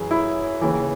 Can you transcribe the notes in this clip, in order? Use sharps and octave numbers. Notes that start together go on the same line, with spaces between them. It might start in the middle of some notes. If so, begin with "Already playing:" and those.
Already playing: F#2 E3 G#4
E4
D#2 C#3 E3